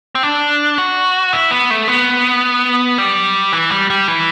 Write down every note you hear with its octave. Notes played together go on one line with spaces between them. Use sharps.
C4
D4
F#4
E4
B3
A3
B3
G3
E3
G3
G3
E3